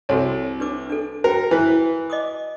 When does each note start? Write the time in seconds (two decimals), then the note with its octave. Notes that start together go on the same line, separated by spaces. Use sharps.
0.09 C2 F#4 A4 C#5
0.60 D4 B4 D6
0.90 D4 A4
1.24 F#4 A#4 G5
1.51 E3 B4
2.10 D#5 D6 D#6